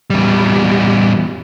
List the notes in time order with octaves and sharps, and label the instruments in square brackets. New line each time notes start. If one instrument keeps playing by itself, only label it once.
[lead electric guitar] E2 G3